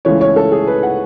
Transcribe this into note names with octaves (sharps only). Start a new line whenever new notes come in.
C#2 C#3 E3 A3 C#5
C#5
A4
G#4
B4
F#5